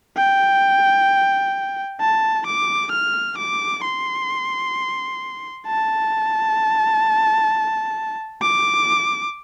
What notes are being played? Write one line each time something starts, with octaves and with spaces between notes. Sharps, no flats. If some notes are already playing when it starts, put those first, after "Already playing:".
G5
A5
D6
F6
D6
C6
A5
D6